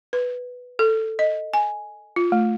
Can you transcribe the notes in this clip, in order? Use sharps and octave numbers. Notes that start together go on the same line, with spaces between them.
B4
A4
D#5
G#5
F4
A3